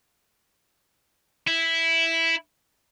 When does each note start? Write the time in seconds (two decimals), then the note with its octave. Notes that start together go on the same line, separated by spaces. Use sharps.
1.47 E4